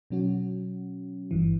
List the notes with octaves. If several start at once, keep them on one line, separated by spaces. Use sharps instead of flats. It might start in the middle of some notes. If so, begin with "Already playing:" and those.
B2 F#3 C#4 F#4
G1 G2 E3